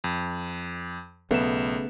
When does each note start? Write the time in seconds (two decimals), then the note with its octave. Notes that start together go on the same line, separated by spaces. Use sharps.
0.04 F2
1.31 B1 C#3 A3 B3 E7